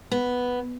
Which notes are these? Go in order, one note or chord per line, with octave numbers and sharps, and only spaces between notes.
B3